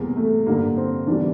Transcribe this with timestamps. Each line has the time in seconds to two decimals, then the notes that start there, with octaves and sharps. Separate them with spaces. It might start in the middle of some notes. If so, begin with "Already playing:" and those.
Already playing: E2 C3 G3 A#3
0.16 A3
0.47 G2 D3 G3 A#3
0.77 C4
1.07 E2 E3 G3 D4